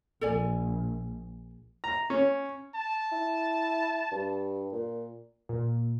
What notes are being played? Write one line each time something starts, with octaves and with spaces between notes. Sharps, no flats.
A#1 A4 D5 G#5
A#5
C#4
A5
E4
G2
A#2
A#2